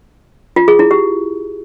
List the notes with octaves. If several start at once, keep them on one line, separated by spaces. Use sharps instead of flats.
F4
G#4
E4
G4